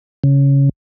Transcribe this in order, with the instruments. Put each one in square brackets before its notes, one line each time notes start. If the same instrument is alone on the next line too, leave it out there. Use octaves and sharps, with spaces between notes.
[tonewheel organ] C#3